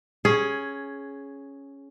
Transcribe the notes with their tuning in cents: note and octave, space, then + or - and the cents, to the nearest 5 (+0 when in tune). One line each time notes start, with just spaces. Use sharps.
C#4 +0 G#4 +10